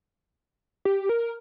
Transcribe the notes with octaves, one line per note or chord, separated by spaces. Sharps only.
G4
A#4